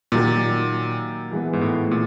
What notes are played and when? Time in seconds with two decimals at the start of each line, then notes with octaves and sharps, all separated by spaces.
0.12 A#2 D#3 F#3 A#3 D#4 G4
1.31 E3 G#3 B3
1.53 G#2
1.61 A2
1.91 A#2